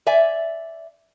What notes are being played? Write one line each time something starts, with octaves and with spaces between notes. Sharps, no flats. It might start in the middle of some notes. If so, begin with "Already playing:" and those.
D5 E5 G#5